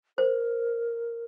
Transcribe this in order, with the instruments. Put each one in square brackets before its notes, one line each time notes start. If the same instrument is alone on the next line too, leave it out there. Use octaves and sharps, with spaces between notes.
[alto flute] A#4 [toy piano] C5